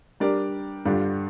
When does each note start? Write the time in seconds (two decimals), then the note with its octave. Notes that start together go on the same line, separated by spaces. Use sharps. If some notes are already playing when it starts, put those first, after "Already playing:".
0.20 G3 D4 G4 A#4 D5
0.85 G2 D3 G3 D4 F4